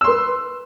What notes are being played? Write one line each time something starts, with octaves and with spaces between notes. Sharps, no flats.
B4 C6 E6